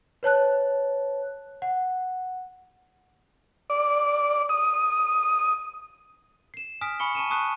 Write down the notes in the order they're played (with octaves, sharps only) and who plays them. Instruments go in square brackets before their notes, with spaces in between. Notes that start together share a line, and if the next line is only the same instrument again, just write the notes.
[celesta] B4 C#5 A5 F#6
F#5
[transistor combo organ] D5
D#6
[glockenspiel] C7 E7
G#5 D#6 F6 B6 D7
G#5 B5 C#6 C#7 G7
A5 C#6 D#7 E7
A5 C#6 D#6 F#6 C7 D#7